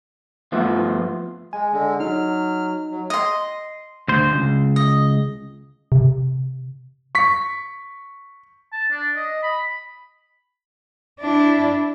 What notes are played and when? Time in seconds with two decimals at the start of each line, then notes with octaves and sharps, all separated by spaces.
0.52 G2 F3 A3 B3 F4
1.53 G#3 G#5
1.73 D3 G#3
2.00 F#3 D#4 F6
2.91 F#3
3.10 D#5 C6
4.08 D2 C5
4.32 C#2
4.76 D#5
5.92 C3
7.15 C#6 B6
8.72 A5
8.91 D4
9.16 D#5
9.43 B5
11.20 D4 E4